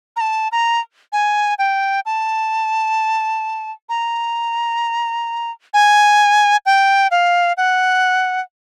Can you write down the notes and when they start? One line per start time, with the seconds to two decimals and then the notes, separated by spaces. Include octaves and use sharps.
0.16 A#5
0.21 A5
0.52 A#5
1.13 G#5
1.59 G5
2.06 A5
3.89 A#5
5.74 G#5
6.66 G5
7.11 F5
7.57 F#5